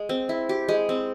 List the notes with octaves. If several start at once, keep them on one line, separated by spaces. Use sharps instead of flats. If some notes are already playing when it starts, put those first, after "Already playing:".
Already playing: G#3
C4
E4
G4
G#3
C4